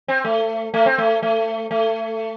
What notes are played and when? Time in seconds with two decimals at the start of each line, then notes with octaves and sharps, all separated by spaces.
0.08 C4
0.25 A3
0.74 A3
0.86 C4
0.98 A3
1.23 A3
1.71 A3